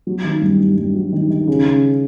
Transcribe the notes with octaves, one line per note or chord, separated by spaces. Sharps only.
F#3
D#3
G2
G2
G2
F#3
D#3
D#3
C#3
C#3